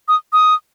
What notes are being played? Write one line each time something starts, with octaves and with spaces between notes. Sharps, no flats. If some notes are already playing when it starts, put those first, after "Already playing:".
D#6
D#6